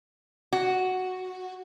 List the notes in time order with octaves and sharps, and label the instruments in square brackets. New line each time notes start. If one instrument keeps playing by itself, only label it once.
[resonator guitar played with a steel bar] F#4